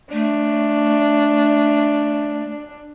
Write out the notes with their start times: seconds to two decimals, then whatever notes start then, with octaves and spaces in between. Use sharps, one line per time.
0.13 A3 D4